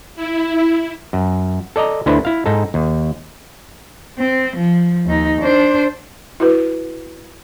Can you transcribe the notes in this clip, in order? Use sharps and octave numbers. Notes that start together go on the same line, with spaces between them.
E4
F#2
A4 D5 D#5 A#5
D2 D3 D4 E4 B4 C5
E4 F5
G#2 D#4 A4
D#2
C4
F3
D#2 D#4
D4 C5
E4 F#4 B4